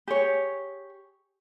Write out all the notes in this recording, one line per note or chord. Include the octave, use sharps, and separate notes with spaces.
G4 G#4 C#5